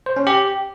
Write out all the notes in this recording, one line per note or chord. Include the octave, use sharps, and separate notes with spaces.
C5
C#4
G4